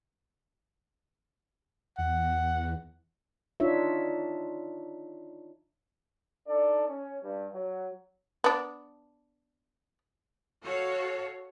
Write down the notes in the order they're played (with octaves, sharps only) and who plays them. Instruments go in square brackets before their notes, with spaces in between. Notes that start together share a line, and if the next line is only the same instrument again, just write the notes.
[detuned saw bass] E2 [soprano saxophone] F#5
[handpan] D4 D#4 F4 C#5 E5
[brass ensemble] D4 D#4 A4 D5
C#4
G2
F#3
[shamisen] B3 D4
[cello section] F#4 A4 C#5 F5